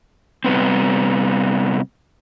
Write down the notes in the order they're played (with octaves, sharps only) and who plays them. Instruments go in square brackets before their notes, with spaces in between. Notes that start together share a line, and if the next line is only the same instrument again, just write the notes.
[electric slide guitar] C3 G3 B3 C4